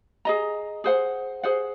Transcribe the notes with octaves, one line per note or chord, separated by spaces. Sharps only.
G#4 D#5 A#5
G#4 C5 F#5
G#4 C5 F#5